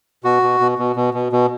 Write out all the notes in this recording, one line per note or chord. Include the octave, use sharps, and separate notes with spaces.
B2 F#4
B2
B2
B2
B2
B2
B2